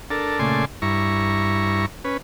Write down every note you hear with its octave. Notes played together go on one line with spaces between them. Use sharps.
D4 A4 A#4
A#2 C#3 A3 D5 G#5 C6
G2 E4 A#5 C#6
C#4 B4